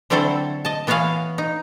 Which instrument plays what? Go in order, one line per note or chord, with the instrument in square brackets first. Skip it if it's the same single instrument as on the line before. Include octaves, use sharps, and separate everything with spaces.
[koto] D3 F#3 C4 E4 A4 C5
D#5 A5
E3 B3 F#4 C#5 F5 G#5
D#4